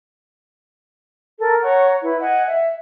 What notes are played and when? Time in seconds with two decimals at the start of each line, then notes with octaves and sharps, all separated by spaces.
1.39 A4 A#4
1.62 C#5 F#5 A#5 C#6
2.02 E4 B4
2.20 D#5 F#5 G#5
2.45 E5